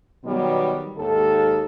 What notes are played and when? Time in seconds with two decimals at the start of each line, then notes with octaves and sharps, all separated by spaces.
0.24 B2 D#3 F#3 G3 B3
0.96 D#2 G#2 D#3 A4